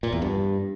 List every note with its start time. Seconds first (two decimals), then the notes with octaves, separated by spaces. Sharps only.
0.03 A#2
0.13 E2
0.22 G2